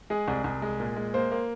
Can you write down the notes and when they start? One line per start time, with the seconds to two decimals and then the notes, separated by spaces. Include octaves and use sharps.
0.10 G#3 G#4
0.28 C2
0.44 C2
0.62 G#3
0.80 A#2
0.96 G#3
1.14 A#3 C5
1.31 A#3